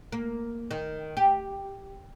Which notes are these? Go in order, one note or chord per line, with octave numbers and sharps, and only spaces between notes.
A#3
D#3
G4